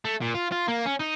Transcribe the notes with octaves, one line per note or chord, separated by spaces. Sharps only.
A3
A#2
F4
F4
A#3
C#4
D#4